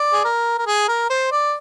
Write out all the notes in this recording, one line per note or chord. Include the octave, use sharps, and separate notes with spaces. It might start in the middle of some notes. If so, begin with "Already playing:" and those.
Already playing: D5
G#4
A#4
A#4
G#4
A#4
C5
D5